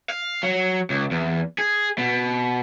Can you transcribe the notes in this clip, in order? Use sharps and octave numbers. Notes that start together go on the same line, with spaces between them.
F5
F#3
C#2
E2
G#4
B2